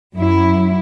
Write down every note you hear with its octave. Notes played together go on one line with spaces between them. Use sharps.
F#2 E4